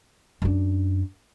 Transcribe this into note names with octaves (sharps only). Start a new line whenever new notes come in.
F#2 D4